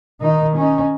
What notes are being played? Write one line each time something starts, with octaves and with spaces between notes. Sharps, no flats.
D#3 D#4
C#4 D#4